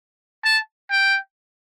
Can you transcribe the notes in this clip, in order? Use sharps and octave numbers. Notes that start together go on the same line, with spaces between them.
A5
G5